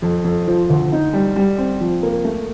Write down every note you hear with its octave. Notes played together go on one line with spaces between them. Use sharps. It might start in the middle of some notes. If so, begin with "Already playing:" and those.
F2
F2
F3
D2
D#4
G3
G3
C4
F3
A#3
A3